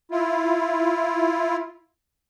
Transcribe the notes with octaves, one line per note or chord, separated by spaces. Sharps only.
E4 F4